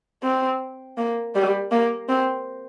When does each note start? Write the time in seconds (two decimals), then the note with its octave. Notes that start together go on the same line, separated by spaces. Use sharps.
0.23 C4
0.98 A#3
1.35 G3
1.71 A#3
2.09 C4